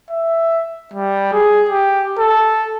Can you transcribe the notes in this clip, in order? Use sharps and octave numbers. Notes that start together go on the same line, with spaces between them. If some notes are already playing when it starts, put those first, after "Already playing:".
E5
G3
G#4
G4
A4